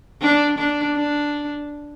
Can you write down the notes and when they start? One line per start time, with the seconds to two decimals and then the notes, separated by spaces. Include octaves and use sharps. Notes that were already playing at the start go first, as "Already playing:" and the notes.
0.21 D4
0.58 D4
0.95 D4